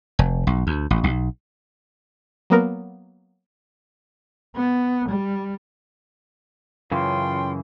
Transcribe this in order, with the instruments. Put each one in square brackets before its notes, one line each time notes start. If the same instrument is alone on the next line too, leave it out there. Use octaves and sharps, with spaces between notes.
[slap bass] F1
B1
D2
A1
B1
[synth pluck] F#3 A#3 B3 A#4
[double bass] B3
G3
[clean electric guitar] F#2 C#3 E3 [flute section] F4 G5 C6